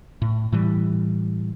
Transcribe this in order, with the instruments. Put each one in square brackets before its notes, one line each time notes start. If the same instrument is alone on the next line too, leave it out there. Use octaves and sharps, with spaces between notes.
[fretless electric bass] A2
A2 E3 G3